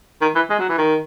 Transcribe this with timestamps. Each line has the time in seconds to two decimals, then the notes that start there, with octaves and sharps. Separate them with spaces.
0.22 D#3
0.35 E3
0.50 G#3
0.59 F#3
0.69 E3
0.78 D#3